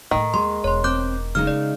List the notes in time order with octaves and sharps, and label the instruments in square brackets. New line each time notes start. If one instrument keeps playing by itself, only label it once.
[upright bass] A2 A3 [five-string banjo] D#3
[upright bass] D#2 [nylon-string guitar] G#3 [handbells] C6
[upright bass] E1 [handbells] C#5 C6
[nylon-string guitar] C4 [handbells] D6 F#6 G6
[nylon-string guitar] C#3 G#3 D#4 [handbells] F6
[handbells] D5